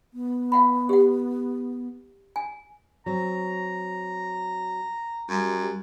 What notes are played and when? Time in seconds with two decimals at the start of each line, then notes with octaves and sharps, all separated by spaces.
0.14 B3
0.52 F5 F#5 B5
0.89 G4 F#5
2.36 G#5
3.06 F#3 C4 A#5
5.29 F#2 G3